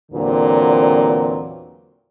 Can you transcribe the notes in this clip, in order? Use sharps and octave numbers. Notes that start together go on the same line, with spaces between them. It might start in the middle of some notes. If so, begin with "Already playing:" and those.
E2 A#2 D3 F#3 C4